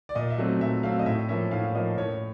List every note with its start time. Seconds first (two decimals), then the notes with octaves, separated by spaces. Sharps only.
0.09 D5
0.15 A#2 D#5
0.30 E5
0.38 F#3 A3 C4
0.60 A#2 E5
0.83 F#3 A3 C4 F5
0.99 D#5
1.06 A2 E5
1.29 F3 A#3 C#4 E5
1.51 A2 F5
1.75 F3 A#3 C#4 D#5
1.97 A2 C#5